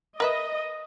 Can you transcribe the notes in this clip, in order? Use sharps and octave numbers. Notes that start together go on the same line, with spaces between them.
A#4 B4 D#5 E5